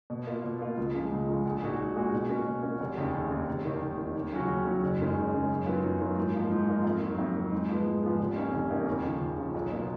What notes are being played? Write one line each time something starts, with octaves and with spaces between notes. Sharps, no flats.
B2
A#3 F4
B2
A#3 F4
C#2
C#3 F3 G#3
C#2
C#3 F3 G#3
A#1
A#2 G#3 D#4 F#4
A#1
A#2 G#3 D#4 F#4
B2
A#3 C#4 F#4
B2
A#3 C#4 F#4
F1
D#2 C#3
F1
D#2 C#3
F1
D#2 D#3
F1
D#2 D#3
D#2
C#3 F#3 C#4 F#4
D#2
C#3 F#3 C#4 F#4
F#1
F#2 D#3 G#3 C#4
F#1
F#2 D#3 G#3 C#4
F#2
D#3 F#3 B3 F4
F#2
D#3 F#3 B3 F4
G#2
F3 A#3 F4
G#2
F3 A#3 F4
F2
D#3 F#3
F2
D#3 F#3
G#2
F3 G#3 B3
G#2
F3 G#3 B3
F1
F2 D#3 A#3 C#4
F1
F2 D#3 A#3 C#4
D#2
C#3 F3
D#2
C#3 F3
B1
B2 A#3 F4